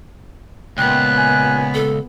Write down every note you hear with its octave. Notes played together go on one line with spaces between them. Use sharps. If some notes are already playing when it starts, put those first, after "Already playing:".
C#2 A#2 B3 G5 F#6
G#5
A4